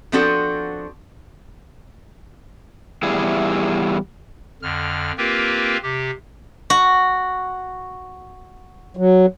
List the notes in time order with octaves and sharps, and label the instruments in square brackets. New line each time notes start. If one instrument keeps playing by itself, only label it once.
[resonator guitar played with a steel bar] F3 B3 C4 D4 F#4 A4
[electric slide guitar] E2 G3 E4 G#4
[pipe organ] F2 D3 F6
A#3 C4 F4 G4 A#4 B4
C3 G4
[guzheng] F#4
[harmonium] F#3